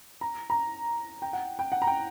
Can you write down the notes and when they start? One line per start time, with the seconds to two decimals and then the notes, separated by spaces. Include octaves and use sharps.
0.21 A#5
0.50 A#5
1.22 G5
1.33 F#5
1.59 G5
1.72 F#5
1.82 A#5
1.87 G5